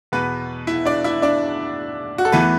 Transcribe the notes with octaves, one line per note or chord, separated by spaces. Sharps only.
E2 B2 B3 B4
E4 E5
D4 D5
E4 E5
D4 D5
F#4
A4
E2 E3 A3 B3 B4